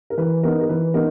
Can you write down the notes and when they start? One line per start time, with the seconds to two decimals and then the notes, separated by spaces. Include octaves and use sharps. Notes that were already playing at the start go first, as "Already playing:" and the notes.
0.10 A#4
0.18 E3 B4
0.43 B3 D#4 A#4
0.61 A#4
0.69 E3 B4
0.94 B3 D#4 A#4